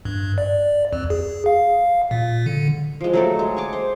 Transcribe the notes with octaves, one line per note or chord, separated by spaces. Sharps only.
G2
D5
F2
G#4
F5
A#2
D3
F3 G#3
F#3 A3 A4
G#3
C#5 G#5 C#6 D6
C5